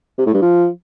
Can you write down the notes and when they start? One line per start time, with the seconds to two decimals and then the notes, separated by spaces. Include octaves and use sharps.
0.18 C3
0.26 A2
0.34 G2
0.42 F3